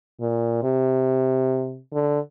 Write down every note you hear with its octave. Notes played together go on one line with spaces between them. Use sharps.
A#2
C3
D3